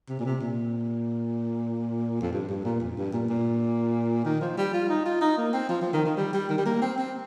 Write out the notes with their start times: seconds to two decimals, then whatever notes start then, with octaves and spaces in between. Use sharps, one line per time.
0.09 C3
0.19 A#2
0.25 C3
0.41 A#2
2.22 F2
2.33 G2
2.49 G2
2.65 A#2
2.81 F2
2.97 G2
3.13 A#2
3.29 A#2
4.25 D#3
4.41 F3
4.58 G3
4.73 F4
4.89 D#4
5.05 F4
5.21 D#4
5.37 A#3
5.53 C4
5.69 F3
5.82 F3
5.93 D#3
6.05 D#3
6.17 G3
6.33 G3
6.49 D#3
6.58 G3
6.65 A#3
6.82 C4
6.98 C4